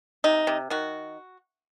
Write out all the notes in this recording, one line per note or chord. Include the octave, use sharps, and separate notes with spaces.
C3 D#4
C3
D#3 F#4